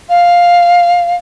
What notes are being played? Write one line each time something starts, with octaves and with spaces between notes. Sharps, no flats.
F5